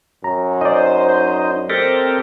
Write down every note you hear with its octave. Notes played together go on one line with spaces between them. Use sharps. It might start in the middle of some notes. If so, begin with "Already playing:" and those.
F#2 A#5
D#4 C5 D5 D#5
C4 G4 A4 A#4